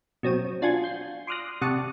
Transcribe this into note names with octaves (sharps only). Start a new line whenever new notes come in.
B2 F#3 C4 D#7
D4 F4 F#4 G#5 G#6
G6 C7
C6 D6 D#6 F6 F#6 A#6
C3 D5 F#5 A5 C#6 D#6